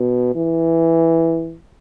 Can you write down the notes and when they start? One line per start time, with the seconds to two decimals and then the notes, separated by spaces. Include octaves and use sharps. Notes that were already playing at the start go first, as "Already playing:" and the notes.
Already playing: B2
0.35 E3